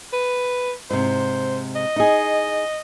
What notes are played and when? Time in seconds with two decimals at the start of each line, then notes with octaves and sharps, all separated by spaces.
0.13 B4
0.90 G#2 C3 C5
1.76 D#5
1.96 D#4 G#4